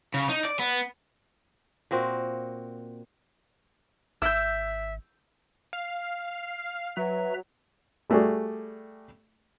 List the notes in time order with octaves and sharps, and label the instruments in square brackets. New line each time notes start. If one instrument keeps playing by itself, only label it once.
[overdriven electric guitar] C#3
D#4
D5
B3
[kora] A#2 A#3 C4 F#4
[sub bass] G#1 [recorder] E5 [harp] E6 G6
[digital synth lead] F5
[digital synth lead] F#3 [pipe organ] B4 E5 A#5
[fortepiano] G3 A3 F#4 G#4 D5